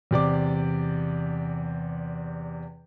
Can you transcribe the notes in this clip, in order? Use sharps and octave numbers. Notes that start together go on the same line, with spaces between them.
E2 C3 D5 D6